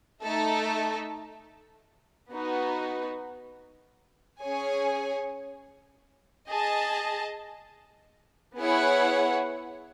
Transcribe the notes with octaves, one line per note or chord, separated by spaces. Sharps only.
A3 D#4 A4 E5
B3 D#4 F#4
C#4 G#4 C#5 G#5
G#4 D#5 A5
B3 E4 G#4 C#5 F#5